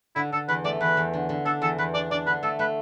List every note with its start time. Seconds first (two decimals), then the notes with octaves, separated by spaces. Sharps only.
0.15 D3 E4
0.32 D3 A4
0.48 E2 B4
0.64 A3 D5
0.81 E2 B4
0.97 E2
1.13 D3
1.29 D3
1.45 D4 A4
1.62 E2 A4
1.78 E2 B4
1.94 D4 D5
2.11 D4 D5
2.27 D3 B4
2.43 A3 A4
2.59 A3 B4